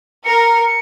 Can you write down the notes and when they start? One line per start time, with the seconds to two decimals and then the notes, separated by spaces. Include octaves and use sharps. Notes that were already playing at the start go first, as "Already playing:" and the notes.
0.25 A#4 C#7
0.66 C#7